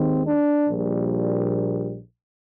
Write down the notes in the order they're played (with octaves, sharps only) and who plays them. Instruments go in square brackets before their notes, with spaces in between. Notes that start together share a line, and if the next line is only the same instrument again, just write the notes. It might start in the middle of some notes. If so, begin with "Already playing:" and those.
Already playing: [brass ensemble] D#2 D#3 G#3 C4
D4
A#1 A#2 G3